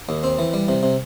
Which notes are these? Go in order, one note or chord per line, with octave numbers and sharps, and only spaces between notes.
D#2
C4
E3
G3
C3
C3